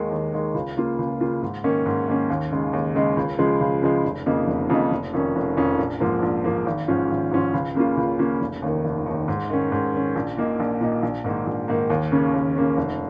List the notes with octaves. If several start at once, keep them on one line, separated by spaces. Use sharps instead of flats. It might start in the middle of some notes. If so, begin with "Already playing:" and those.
Already playing: D#2 D#3 G#3 D#4
D#2
D#3 G#3 D#4
C#2
C#3 A#3 F4
C#2
C#3 A#3 F4
G#2
D#3 A#3 C#4
G#2
D#3 A#3 C#4
D#2
C#3 G#3 D#4
D#2
C#3 G#3 D#4
C#2
C#3 F3 G#3
C#2
C#3 F3 G#3
F1
F2 C#3 A#3 D#4
F1
F2 C#3 A#3 D#4
F1
F2 D#3 C#4
F1
F2 D#3 C#4
A#1
G#2 F3 A#3
A#1
G#2 F3 A#3
G#1
G#2 F3 C#4 F4
G#1
G#2 F3 C#4 F4
C#2
C#3 A#3 C#4 F4
C#2
C#3 A#3 C#4 F4
F1
D#2 D#3
F1
D#2 D#3
G#2
D#3 C#4
G#2
D#3 C#4
A#1
A#2 A#3 D#4
A#1
A#2 A#3 D#4
A#1
G#2 D#3 A#3
A#1
G#2 D#3 A#3
D#2
C#3 A#3 C#4
D#2
C#3 A#3 C#4
F1